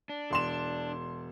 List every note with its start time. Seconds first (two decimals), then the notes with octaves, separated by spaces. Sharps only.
0.09 D4
0.31 E1 C6 E7